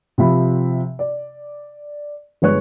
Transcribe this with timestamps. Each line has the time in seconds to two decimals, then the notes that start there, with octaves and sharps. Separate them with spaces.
0.18 C3 F3 E5 B5
0.99 D5
2.42 G1 G#3 B4 C#5 F#6